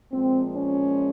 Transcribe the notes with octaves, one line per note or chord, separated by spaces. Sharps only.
A#2 F3 G#3 C4
C#4